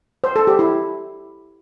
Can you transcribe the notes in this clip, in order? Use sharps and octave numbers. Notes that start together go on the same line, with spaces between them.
C5
A4
G4
E4